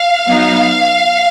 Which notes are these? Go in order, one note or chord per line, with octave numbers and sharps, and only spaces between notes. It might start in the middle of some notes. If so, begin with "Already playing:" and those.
Already playing: F5
F#3 B3 D#4